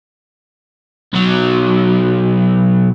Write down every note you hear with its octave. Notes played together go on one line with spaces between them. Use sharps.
B1 F#3